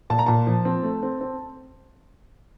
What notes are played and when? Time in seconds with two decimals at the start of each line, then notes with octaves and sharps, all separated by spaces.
0.10 A#2 A5
0.19 A#5
0.26 A#2 A5
0.47 F3
0.65 C4
0.83 A3
1.03 C4
1.21 C4